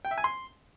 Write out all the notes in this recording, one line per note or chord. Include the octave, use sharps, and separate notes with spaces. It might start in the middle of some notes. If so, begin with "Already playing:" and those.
G5
E5
G#5
C6